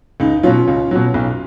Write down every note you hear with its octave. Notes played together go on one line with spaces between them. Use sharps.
C#2 D#4
D#4
B2 F#3 C#4 F4
C#2
B2 F#3
B1